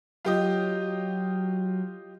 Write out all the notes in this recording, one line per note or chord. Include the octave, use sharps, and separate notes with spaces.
F#3 F4 G4 D#5